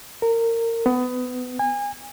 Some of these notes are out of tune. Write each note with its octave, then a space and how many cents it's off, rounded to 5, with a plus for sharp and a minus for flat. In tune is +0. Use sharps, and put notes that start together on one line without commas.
A#4 -25
B3 +25
G#5 -30